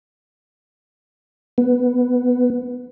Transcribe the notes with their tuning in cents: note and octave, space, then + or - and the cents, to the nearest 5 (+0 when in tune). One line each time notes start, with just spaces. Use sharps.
B3 +5